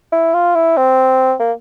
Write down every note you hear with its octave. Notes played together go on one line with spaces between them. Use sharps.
E4
F4
E4
C4
A#3